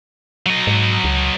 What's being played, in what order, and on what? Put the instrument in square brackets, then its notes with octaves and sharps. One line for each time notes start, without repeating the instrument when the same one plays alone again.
[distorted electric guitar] F#3 D#5
[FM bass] G#2
C#2